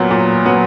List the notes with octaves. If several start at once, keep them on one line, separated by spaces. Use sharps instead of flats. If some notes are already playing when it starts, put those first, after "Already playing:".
Already playing: A#2 F#3 B3
A#2
F#3 B3